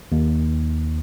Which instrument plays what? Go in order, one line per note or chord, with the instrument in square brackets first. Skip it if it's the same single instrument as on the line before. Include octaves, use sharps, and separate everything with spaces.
[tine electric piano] D#2